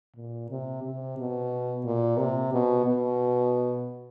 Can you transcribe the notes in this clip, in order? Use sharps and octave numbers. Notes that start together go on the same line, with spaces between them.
A#2
C3
C3
B2
A#2
C3
B2
B2